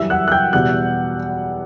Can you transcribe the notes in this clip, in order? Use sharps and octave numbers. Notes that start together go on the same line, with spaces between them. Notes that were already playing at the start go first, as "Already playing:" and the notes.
Already playing: F#2 E3 G3 E5 E6
F#5 F#6
F#6
G5 G6
E2 B2 G3 F#5 F#6